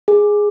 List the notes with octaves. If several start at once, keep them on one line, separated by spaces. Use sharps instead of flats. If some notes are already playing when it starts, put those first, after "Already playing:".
G#4